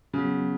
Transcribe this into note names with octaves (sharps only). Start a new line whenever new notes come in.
C#3 F#3 B3 F#4